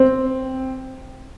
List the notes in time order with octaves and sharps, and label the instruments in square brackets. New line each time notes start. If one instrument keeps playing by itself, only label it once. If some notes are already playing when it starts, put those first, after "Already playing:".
Already playing: [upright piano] C4